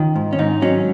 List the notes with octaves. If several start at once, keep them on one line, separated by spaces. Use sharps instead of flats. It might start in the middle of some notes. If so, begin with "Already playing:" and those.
Already playing: D#3 C#4 F4
G#2
C#4
G#2 D#4
F#3 C#4